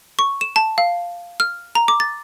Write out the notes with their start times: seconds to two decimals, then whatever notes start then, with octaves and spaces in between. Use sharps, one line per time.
0.19 C#6
0.41 E7
0.56 A5
0.78 F5
1.40 F6
1.75 A#5
1.88 D6
2.00 A6